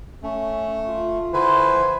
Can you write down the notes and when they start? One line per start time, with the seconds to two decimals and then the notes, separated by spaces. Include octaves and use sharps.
0.23 A3 C#4
0.87 F4
1.34 D3 E4 B4 C5 G#5
1.72 F3